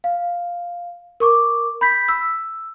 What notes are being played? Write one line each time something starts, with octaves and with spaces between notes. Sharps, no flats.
F5
A#4 C#6 D6
B5 G6 B6
E6